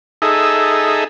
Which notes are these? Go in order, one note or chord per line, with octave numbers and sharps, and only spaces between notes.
D#4 G#4 A4 E5